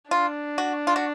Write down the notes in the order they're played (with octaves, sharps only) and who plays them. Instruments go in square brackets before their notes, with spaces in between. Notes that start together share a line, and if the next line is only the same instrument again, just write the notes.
[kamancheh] D4 [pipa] F4
[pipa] F#4
F4
F#4